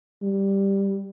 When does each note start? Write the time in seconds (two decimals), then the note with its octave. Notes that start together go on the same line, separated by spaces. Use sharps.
0.22 G3